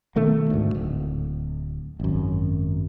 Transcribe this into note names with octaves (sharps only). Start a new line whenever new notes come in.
B2 D#3 A3 A#3
D2 G#2
D1
G#1 F#2